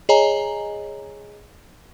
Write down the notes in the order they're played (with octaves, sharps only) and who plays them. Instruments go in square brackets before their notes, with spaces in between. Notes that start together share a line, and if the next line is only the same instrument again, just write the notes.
[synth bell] G#4 C#5 D#5 G#5 A#5